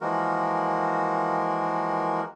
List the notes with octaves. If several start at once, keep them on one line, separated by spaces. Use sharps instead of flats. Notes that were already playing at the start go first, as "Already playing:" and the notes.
E3 F3 G#3 A#3 F#4 A#4